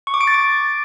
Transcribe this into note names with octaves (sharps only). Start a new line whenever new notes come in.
C#6
D6
D7
A6
D6